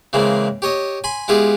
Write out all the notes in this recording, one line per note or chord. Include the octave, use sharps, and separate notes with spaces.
C#3 E3 G#3 A#3 C4
G4 C#5 D#5
G#5 B5 C6
G#3 B3 E4 F4 G4 G#4